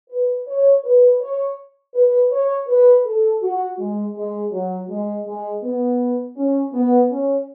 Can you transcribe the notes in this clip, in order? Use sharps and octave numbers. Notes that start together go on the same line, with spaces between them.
B4
C#5
B4
C#5
B4
C#5
B4
A4
F#4
G#3
G#3
F#3
G#3
G#3
B3
C#4
B3
C#4